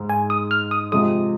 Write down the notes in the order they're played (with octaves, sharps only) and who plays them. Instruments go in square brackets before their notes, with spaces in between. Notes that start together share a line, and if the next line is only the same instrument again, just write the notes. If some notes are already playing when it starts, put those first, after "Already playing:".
Already playing: [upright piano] G#2 G#3
[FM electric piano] G#5
D#6
F6
D#6
[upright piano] C3 F3 G#3 [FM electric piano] D#6